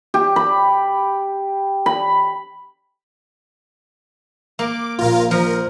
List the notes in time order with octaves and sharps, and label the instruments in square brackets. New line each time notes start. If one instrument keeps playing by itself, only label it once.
[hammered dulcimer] G4
B5
B5
[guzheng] A#3 [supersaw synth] D6
[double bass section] A#1 [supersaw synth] F4 A#4 F5
[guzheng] F3 [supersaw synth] A#4